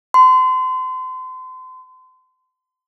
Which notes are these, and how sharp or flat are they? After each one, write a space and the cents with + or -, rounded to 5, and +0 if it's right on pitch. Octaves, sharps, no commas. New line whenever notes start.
C6 -35